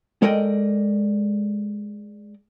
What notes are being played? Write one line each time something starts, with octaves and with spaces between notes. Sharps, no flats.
G#3 A4 A#4 D5 D#5 G5